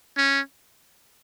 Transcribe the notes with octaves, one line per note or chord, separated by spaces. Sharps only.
C#4